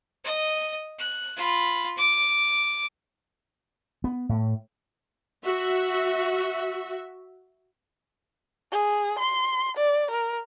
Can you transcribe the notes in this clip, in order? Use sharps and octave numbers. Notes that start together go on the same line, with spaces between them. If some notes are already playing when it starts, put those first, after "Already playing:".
D#5
F#6
F4 B5
D6
B3
A2
F#4 E5
G#4
C6
D5
A#4